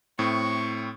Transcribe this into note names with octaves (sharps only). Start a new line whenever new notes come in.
A2 C4 C#6